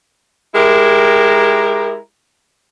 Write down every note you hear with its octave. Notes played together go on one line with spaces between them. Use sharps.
G#3 E4 G4 A#4